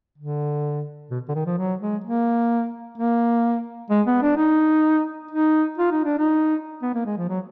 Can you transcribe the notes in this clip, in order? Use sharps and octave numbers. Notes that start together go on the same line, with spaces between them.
D3
B2
D3
D#3
F3
F#3
G#3
A#3
A#3
G#3
B3
D4
D#4
D#4
F4
D#4
D4
D#4
B3
A#3
G#3
F3
F#3